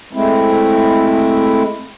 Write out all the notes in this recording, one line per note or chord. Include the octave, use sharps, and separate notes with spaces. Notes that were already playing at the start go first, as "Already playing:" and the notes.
G#3 A3 C4 E4